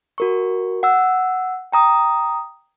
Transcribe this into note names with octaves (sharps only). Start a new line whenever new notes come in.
F#4 A#4 C#6
F#5 E6
G5 A#5 D#6